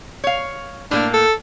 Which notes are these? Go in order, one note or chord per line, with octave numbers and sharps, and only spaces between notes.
C#5 F5
A2 G3 A#3 D4
A4